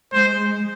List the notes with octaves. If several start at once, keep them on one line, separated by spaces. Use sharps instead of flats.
G#3 C5